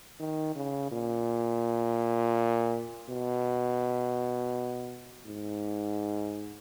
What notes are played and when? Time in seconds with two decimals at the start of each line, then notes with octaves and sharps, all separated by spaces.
0.20 D#3
0.56 C#3
0.92 A#2
3.09 B2
5.27 G#2